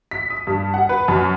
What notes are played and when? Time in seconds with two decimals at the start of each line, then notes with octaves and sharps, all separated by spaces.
0.11 B6
0.30 D#6
0.47 G2
0.74 F#5
0.89 B4
1.08 F#2